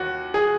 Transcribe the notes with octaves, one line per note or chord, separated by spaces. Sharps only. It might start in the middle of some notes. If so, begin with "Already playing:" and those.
Already playing: D#2 F#4
G#4